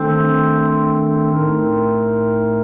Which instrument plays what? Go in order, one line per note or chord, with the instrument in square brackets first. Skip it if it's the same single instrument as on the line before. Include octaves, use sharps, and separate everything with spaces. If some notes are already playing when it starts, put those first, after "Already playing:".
Already playing: [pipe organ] D#3 A3 D4 A4 [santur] C4
[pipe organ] A2 A3 D#4 A#4